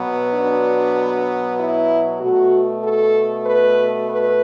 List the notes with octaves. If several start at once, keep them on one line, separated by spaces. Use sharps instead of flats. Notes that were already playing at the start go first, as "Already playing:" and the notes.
Already playing: B2 F#3 B3
D4
E4
B2 A3 F#4
A4
B4
B4